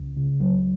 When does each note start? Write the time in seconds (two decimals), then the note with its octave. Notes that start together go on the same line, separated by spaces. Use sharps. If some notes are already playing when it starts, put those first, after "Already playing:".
Already playing: C#2
0.16 C#3
0.40 C#2 F#3